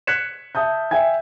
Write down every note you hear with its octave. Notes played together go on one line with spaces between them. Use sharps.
F#6 G#6 B6 C#7 E7
E5 A5 D#6 G6
E5 G5 G#5 G#6